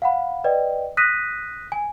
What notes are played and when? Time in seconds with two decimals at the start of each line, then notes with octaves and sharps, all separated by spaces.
0.02 F5 F#5 B5
0.44 B4 D5 D#5 G5
0.97 D#6 F#6 A#6 B6 D#7
1.72 G#5